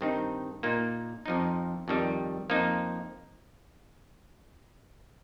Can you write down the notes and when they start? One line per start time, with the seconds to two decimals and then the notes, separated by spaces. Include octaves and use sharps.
0.01 G2 D#3 C4 D#4
0.63 A#2 A#3 D#4
1.26 F2 F3 D#4
1.88 F2 D#3 G3
2.50 F2 F3 A#3 D#4